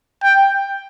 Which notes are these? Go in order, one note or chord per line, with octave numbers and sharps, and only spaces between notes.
G5